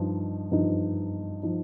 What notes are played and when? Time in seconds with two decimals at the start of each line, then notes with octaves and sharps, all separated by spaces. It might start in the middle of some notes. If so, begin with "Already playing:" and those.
Already playing: G2 F3 D#4
0.52 G2 F3 D#4
1.43 F3 D#4